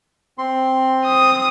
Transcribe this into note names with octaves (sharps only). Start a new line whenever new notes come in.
C4 C6
D#6